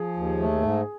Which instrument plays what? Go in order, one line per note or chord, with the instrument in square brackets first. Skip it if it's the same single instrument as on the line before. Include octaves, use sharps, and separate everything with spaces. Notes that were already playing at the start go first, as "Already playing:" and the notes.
Already playing: [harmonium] F3 [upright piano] G#4
[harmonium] D#2
A3
G#2